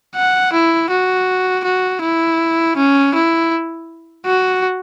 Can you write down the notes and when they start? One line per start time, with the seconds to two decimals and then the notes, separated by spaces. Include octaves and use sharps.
0.16 F#5
0.53 E4
0.90 F#4
1.65 F#4
2.02 E4
2.77 C#4
3.14 E4
4.26 F#4